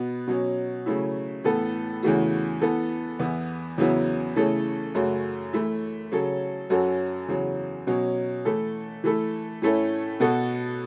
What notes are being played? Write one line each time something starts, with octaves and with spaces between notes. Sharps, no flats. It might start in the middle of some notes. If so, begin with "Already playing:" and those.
Already playing: B2 B3 F#4
B2 F#3 C#4
C#3 F#3 A3 C#4 E4
A2 E3 B3 A4
E2 C#3 E3 A3 F#4
E3 B3 A4
E2 E3 B3 E4
E2 C#3 F#3 B3 E4
C#3 E3 A3 C#4 A4
F#2 C#3 A3 F#4
E3 A3 E4
C#3 F#3 C#4 A4
F#2 F#3 C#4 F#4 A4
E2 C#3 F#3
B2 F#3 C#4
E3 A3 E4 A4
E3 A3 E4 A4
A2 A3 C#4 E4 A4
B2 B3 F#4 A4